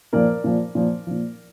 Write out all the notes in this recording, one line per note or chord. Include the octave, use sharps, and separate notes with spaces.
A#2 F3 A#4 D5
A#2 F3
A#2 F3
A#2 F3